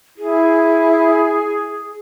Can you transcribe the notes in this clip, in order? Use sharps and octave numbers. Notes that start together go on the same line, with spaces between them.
E4 G#4